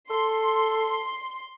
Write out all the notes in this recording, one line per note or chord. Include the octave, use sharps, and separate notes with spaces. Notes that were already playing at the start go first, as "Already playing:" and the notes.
A4 C6